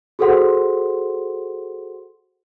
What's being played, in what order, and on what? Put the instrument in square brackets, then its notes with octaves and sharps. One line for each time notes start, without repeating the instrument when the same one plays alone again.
[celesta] F#4 G#4 A4 C5 F#5 C6